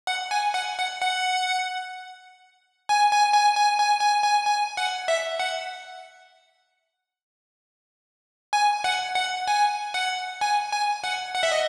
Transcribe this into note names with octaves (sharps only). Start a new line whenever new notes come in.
F#5
G#5
F#5
F#5
F#5
G#5
G#5
G#5
G#5
G#5
G#5
G#5
G#5
F#5
E5
F#5
G#5
F#5
F#5
G#5
F#5
G#5
G#5
F#5
F#5
E5
D#5